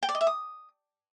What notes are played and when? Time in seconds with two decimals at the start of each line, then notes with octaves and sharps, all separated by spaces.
0.03 G5
0.09 D5
0.15 D#5
0.21 E5
0.27 D#6